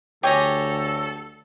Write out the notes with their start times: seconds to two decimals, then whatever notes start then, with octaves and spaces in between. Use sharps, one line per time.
0.23 D2 G4 A4 C#5 G#5 A#5